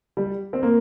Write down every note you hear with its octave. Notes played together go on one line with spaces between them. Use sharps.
G3
C4
A#3